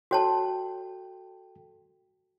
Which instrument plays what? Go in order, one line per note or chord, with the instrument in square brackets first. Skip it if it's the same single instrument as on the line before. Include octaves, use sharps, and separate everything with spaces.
[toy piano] F#4 C#5 A5 [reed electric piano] A4 G5